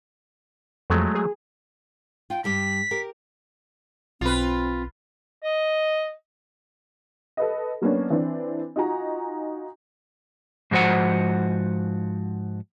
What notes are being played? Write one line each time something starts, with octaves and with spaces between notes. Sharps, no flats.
F2 F#3 G#3 A3
G#4
F4 G5
G2 G3 G4 B6
G4 A#4
B1 C4 F4 B4
D#5
A4 B4 D#5
F#3 A#3 B3 C#4 D4
E3 C4 D4
D#4 F4 F#4 G#5 A#5
G#2 F3 F#4 C5 F#5